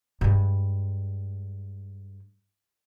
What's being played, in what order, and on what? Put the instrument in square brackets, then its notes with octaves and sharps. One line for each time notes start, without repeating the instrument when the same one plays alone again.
[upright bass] G2 G#3